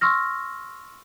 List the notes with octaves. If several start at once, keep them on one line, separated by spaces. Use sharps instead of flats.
C6 C#6 E6 F6 A#6